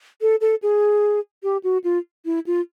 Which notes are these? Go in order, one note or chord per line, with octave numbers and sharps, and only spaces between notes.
A4
A4
G#4
G4
F#4
F4
E4
F4